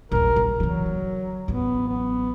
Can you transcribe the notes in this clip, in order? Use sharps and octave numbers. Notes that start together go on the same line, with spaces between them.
A#1 D#2 A#4
A#1
C#3 E3 F#3
D3
A1 F#3 B3
B3